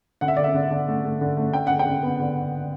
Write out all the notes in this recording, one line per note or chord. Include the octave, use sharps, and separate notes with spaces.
D3 F#5
E5
D3 D5
E5
D3
D3
A3
A3
D3
A3
D3 G5
D3 F#5
G5
D3
B3
D3